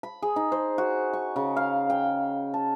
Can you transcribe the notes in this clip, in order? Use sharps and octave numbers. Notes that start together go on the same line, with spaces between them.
B5
G#4
D#4
C5
F#4
C#6
C#3
F5
G5
A5